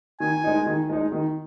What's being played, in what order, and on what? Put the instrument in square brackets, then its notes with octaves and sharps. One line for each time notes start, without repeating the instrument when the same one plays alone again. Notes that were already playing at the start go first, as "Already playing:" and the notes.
[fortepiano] D#3 [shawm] G#5
[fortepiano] G#3 D#4
D#3
G#3 D#4
D#3